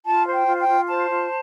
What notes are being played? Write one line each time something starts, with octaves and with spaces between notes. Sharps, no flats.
F4 A5
C5
G5
F4
G5
F4
C5 A5
F4